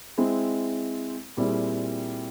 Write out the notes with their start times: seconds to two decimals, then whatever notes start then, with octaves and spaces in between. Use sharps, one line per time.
0.18 G#3 C4 E4
1.37 A#2 G3 C4 E4 G#4